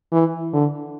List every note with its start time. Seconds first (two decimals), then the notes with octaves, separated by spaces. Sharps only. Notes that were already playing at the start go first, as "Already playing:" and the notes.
0.13 E3
0.53 D3